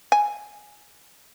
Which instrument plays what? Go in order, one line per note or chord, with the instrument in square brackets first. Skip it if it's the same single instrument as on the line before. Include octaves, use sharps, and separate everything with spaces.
[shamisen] G#5